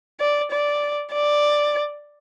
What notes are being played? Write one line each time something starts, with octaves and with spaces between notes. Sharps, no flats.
D5
D5
D5